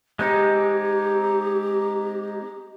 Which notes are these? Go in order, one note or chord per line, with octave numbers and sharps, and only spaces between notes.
G#3 C4 D#4 G4